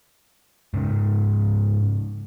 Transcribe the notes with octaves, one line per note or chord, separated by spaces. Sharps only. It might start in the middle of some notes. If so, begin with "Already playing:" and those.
G#2 C#3